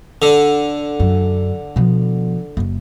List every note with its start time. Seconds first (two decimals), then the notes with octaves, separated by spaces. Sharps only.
0.22 D3
1.00 F#2
1.76 B2 F3
2.57 F#1